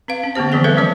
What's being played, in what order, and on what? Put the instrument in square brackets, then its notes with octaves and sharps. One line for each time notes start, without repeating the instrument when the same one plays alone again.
[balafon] C4 B4 F5
C#4
D3 A#3 B3 G4 C5
D3 E3 F3 C4 G#4 G#5
G3 A4 B4 E5
D#3 F3 F#3 C#4 B4 C#5